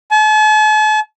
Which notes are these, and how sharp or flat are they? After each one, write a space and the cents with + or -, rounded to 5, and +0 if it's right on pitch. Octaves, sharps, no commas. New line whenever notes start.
A5 -45